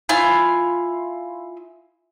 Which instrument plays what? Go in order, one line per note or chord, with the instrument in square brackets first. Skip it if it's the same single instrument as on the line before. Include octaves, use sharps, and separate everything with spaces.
[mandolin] E4 F4 G#5